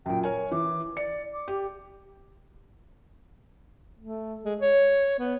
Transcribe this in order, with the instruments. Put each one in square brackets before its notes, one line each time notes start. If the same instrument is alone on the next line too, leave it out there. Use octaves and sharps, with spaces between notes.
[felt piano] F#2 A#2 [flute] G5
[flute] A#4 [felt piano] C#5 G#5
[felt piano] E3 [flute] D6
[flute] D5 [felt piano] C#7
[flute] D6
[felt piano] G4
[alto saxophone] A3
G#3
C#5
B3